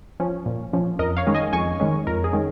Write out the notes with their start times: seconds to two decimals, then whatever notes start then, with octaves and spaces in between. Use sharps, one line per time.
0.20 F3 C#4
0.46 A#2
0.73 F3 C#4
0.99 F2 A#4 D#5
1.17 C#5 F5
1.27 D#3 G#3 C#4
1.35 D#5 G#5
1.52 F2 G#5 C#6
1.80 D#3 G#3 C#4
2.07 F2 A#4
2.24 G#4
2.33 D#3 G#3 C#4